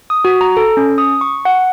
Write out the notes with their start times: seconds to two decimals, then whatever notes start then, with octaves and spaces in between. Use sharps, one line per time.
0.10 D#6
0.25 F#4
0.41 A#5
0.57 A4
0.77 C#4
0.98 D#6
1.21 C#6
1.45 F#5